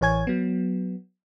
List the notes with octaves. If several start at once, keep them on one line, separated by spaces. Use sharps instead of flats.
A1 E3 C#5 G#5 G#6
F#3 B3